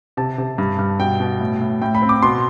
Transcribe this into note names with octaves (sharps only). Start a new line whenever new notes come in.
C3 A5
C3
G2
G2
B2 G5
B2
A2
A2
A2 G5
B5
C4
D6
B2 C6